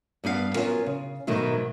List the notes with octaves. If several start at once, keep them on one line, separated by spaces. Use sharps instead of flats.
G2 B3 D#4 F5 F#5
F#3 A3 B3 C#4 F4 A#4
C#3
G#2 B2 D#3 F#3 A3